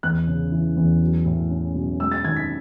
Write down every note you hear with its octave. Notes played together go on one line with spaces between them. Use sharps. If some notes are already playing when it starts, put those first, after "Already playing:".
E2 F#6
C#3
E3
E2
F#3
A2
C#4
B1
G#3 E6
A6
D#3 G#6
B6